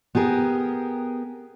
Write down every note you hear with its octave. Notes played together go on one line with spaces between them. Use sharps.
B3 G4 G#4 A#4